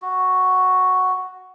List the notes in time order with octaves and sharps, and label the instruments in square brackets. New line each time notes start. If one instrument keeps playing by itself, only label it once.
[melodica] F#4